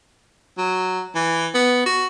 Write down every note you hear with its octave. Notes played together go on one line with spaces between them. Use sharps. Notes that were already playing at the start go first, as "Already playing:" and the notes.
F#3
E3
B3
F#4